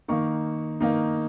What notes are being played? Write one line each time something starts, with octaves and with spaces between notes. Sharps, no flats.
D#3 A#3 D#4 C#6
D#3 A#3 D#4